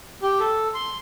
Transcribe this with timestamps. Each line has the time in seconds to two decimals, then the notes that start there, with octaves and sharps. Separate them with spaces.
0.22 G4
0.40 A4
0.74 C6